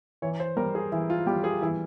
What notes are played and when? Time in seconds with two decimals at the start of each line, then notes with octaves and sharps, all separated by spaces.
0.22 E3 C#5
0.40 C5
0.57 G3 A#4
0.75 G#4
0.92 E3 E4
1.10 F4
1.26 G3 G4
1.44 G#4
1.62 E3 E4